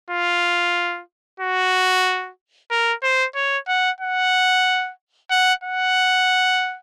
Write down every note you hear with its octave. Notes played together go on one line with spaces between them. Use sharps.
F4
F#4
A#4
C5
C#5
F#5
F#5
F#5
F#5